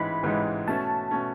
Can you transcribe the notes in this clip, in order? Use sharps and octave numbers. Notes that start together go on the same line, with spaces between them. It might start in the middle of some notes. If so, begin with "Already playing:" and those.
Already playing: A1 G#2 E3 G#3 D#4 B5
A1 G#2 E3 G#3 D#4
B2 A3 C#4 A5
B2 A3 C#4